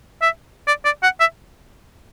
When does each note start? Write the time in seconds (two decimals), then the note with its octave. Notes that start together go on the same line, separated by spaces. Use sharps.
0.22 E5
0.67 D5
0.85 D5
1.03 F#5
1.20 E5